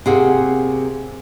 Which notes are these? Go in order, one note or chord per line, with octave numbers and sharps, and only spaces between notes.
C3 A#3 F#4 G#4